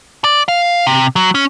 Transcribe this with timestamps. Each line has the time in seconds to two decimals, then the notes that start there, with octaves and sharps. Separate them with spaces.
0.24 D5
0.48 F5
0.87 C3
1.16 F#3
1.35 C#4